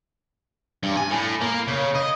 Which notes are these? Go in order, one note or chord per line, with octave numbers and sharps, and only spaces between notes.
G2
G#5
A2
A#3
C#3
D#5